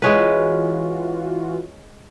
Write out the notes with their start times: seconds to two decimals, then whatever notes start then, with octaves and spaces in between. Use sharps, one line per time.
0.02 E3 G#3 C#4 F4 F#4 B4